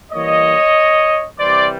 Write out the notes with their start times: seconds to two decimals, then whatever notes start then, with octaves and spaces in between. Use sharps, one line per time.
0.12 E3 G3 A#3 C#5 D#5
1.39 C3 E3 G3 C5 D5